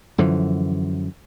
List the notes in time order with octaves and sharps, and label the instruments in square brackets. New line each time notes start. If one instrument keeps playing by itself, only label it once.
[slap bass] F#2 D3 E3 F3